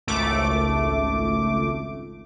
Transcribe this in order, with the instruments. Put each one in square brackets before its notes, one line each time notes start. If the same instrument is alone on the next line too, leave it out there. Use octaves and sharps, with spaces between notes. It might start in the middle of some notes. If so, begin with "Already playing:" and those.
[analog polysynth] G#1 C#2 A3 D6